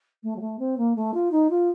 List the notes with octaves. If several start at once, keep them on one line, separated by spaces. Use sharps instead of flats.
A3
F#3
A3
C4
A#3
A3
F4
D#4
F4